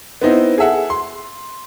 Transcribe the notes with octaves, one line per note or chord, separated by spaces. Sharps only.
B3 C4 D#4 E4
G#4 A4 E5 F#5
C6